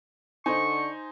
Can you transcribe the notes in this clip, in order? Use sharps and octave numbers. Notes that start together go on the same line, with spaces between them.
D3 D#4 C5 G#5 C#6